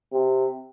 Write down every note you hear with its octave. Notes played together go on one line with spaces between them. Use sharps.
C3